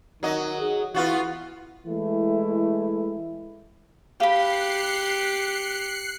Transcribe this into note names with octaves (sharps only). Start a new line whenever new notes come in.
D#3 F#3 D#5
G#4
E3 B3 F4 F#4
E3 G#3 A3 E4
G4 F5 B5 F#6 C7 C#7